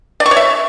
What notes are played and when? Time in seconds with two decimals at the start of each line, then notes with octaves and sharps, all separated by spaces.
0.20 D5
0.26 C#6
0.31 C#5
0.37 E5